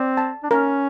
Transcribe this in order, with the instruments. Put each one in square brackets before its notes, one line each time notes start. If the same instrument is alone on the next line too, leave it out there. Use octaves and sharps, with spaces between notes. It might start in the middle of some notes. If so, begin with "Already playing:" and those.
Already playing: [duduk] C4 [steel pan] D5
[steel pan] A5
[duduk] D4
[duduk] C#4 [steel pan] A#4